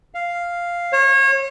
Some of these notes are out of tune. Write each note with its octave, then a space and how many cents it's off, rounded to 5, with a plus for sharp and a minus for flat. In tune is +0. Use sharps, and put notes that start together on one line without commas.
F5 -5
C#5 -30